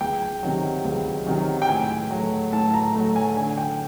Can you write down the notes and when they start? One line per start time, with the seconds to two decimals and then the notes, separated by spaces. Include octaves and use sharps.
0.01 C#2 G5
0.43 C3 D#3 F#3
0.85 C#2
1.27 C3 D#3 F#3
1.62 G5
1.69 A2 G#5
2.11 F#3 A3
2.52 A2 A5
2.74 A#5
2.95 F#3 A3
3.16 G#5
3.37 D3 G#5
3.58 G5